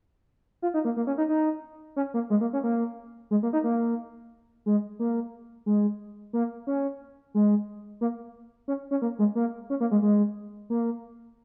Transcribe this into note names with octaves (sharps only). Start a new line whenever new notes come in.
F4
D#4
A#3
A#3
C#4
D#4
D#4
C#4
A#3
G#3
A#3
C#4
A#3
G#3
A#3
D#4
A#3
G#3
A#3
G#3
A#3
C#4
G#3
A#3
C#4
C#4
A#3
G#3
A#3
C#4
A#3
G#3
G#3
A#3